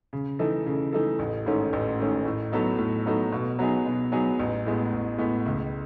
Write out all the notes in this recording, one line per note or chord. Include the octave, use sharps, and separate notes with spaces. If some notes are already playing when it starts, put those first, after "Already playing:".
C#3
E3 A3 D#4 A4
C#3
E3 A3 D#4 A4
A1
G#2 D#3 A3 C#4
A1
G#2 D#3 A3 C#4
A2
F#3 B3 D#4 A4
A2
F#3 B3 D#4 A4
B2
F#3 B3 D#4 G#4
B2
F#3 B3 D#4 G#4
A1
A2 G#3 B3
A1
A2 G#3 B3
C#2